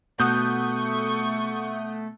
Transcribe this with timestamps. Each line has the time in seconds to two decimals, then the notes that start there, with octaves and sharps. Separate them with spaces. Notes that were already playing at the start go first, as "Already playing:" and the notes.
0.20 B2 A3 F#5 C#6 D#6 G6